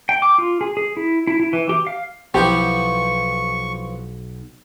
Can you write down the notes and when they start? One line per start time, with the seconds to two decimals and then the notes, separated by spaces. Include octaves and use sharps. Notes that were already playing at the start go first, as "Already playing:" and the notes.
0.09 G5
0.22 D6
0.38 F4
0.61 G#4
0.77 G#4
0.97 E4
1.27 E4
1.40 E4
1.53 E3
1.69 G4
1.87 F5
2.34 B1 F3 B3 E4 G4 C#6